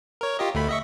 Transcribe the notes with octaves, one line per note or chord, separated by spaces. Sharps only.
A#4 C#5
F4 G4 D#5
D2 A3 B5
D#5 E5 C#6